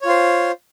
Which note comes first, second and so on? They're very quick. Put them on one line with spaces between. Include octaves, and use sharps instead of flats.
C#5 F4 C5